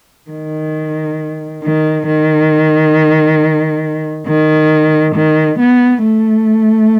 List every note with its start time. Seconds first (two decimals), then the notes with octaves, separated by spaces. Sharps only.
0.30 D#3
1.63 D#3
2.06 D#3
4.27 D#3
5.15 D#3
5.59 B3
6.03 A3